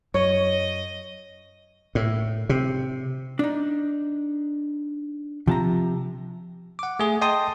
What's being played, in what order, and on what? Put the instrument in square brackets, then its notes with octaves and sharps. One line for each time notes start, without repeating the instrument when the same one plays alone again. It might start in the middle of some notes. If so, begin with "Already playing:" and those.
[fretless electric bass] F#2 [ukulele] C#5 [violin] D#5
[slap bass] A2
C3
[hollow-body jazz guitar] D4 D#4
[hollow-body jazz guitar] C3 A5 A#5 [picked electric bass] F3
[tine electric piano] F#5 D6
A3 G#4
D#5 G5 A5 C6 D#6